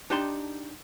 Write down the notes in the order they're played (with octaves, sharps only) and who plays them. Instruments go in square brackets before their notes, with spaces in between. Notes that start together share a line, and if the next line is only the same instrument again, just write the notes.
[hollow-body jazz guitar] D4 D#4 G4 A5 C6